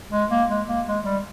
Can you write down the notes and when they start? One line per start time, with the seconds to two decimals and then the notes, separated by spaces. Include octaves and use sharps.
0.12 G#3
0.31 A#3
0.49 G#3
0.68 A#3
0.87 G#3
1.05 G3